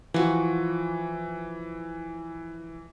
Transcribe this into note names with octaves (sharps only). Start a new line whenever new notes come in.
E3 F3 F#4